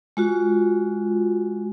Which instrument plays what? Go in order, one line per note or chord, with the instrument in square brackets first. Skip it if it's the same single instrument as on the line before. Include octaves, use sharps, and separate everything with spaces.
[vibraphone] G#3 F4 F#4